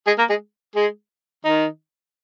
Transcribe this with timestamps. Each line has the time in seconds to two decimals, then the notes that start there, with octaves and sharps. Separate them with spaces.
0.07 G#3 G#4
0.18 A#3 A#4
0.29 G#3 G#4
0.75 G#3 G#4
1.44 D#3 D#4